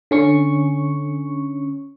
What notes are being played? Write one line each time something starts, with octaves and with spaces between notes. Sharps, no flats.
D3 C#4 C#6